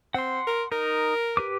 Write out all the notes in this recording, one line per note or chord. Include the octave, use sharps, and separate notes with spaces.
C4 F#5 C6
A#4
D#4 A#4
G4 B4 D6